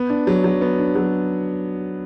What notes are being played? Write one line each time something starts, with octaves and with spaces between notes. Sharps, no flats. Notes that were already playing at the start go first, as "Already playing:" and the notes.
Already playing: B3
D4
F#3
F#3
B3
D4
F#3